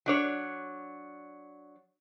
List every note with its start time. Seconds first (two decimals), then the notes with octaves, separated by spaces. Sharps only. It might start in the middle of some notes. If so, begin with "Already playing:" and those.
0.06 F#3 D4 C#5